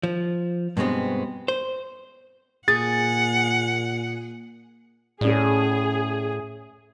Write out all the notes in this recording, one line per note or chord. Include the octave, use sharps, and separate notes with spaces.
F3
G2 B2 G#3 B3 C4
C5
A#2 G#4 F#5 A6
A2 C#4 G#4 D5